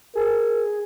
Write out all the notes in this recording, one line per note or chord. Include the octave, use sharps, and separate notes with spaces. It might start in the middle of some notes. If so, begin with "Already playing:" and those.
G#4 A#4